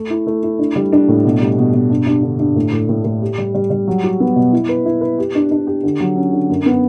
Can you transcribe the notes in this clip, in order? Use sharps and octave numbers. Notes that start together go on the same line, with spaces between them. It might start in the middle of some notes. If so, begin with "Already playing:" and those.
Already playing: A3
E4
A3
E4
D4
G3
D4
A2
B2
G3
B2
B2
G2
G2
D3
G2
A2
A2
A2
A2
G4
G3
G3
G3
F#3
F#4
B3
B2
E4
B4
E4
B4
G4
D4
D4
G4
D3
F#3
C#4
D3
F#2
B3